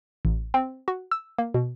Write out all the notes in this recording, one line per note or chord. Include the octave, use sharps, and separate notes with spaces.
A1
C4
F#4
E6
A#3
B2